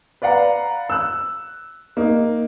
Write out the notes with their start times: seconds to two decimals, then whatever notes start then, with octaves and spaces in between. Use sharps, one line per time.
0.22 B4 D5 F5 F#5 A#5
0.90 E6 F#6
1.97 A#3 D#4